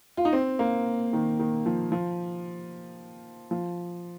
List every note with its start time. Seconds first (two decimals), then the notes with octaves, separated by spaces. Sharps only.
0.17 F4
0.25 D#4
0.33 C4
0.59 A#3
1.13 D#3
1.40 D#3
1.66 F3
1.92 F3
3.51 F3